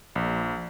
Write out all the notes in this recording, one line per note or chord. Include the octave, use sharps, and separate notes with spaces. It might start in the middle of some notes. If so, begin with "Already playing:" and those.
A#1